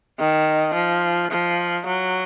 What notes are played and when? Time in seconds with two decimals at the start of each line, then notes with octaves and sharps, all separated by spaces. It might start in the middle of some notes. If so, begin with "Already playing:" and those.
0.19 D#3
0.75 F3
1.31 F3
1.86 F#3